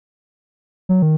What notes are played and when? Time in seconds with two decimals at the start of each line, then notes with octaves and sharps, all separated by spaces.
0.89 F#3
1.02 D#3